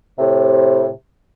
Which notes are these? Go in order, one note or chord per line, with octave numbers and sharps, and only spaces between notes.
A2 C3